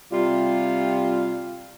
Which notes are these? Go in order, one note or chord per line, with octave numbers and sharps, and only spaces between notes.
C3 G3 F4